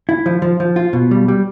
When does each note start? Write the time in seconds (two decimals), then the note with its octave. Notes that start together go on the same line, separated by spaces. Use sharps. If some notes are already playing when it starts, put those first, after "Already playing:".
0.09 E4
0.26 F3
0.42 F3
0.60 F3
0.76 F4
0.93 B2
1.11 G3
1.28 G3